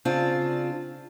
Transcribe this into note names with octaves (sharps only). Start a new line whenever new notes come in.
C#3 C4 D4 F4